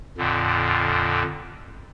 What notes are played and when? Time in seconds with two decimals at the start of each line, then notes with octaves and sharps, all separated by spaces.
0.18 F2 A#2 D3